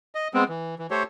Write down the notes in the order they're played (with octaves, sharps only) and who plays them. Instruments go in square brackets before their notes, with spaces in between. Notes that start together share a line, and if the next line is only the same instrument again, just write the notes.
[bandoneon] D#5
G#3 B3 C4
E3
E3
A3 G4 A4 C5 C#5